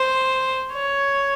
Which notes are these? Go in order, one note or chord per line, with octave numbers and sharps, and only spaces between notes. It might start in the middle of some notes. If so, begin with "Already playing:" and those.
Already playing: C5
C#5